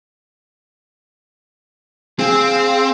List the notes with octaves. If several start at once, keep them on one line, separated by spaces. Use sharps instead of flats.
C4 G#4 F5